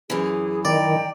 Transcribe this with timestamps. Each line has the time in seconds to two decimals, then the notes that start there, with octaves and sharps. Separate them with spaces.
0.10 F#2 E3 G#4
0.65 D#3 D5 D#5 G5 A#5